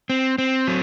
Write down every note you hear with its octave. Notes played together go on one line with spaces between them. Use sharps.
C4
C4
F#3